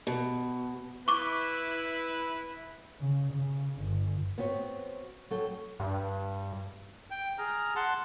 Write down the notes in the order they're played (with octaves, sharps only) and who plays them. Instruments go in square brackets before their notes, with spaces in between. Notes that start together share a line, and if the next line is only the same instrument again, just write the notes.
[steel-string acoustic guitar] B2
[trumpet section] E4 B4 [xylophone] C#6 D6
[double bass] C#3
C#3
G1
[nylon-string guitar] B3 C4 F#4 C#5
F#3 A4 G5
[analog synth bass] G2
[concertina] G5
G#4 A#5 F6
F#5 A5 C6